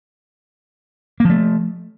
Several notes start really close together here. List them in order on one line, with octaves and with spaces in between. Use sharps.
A#3 F3 A3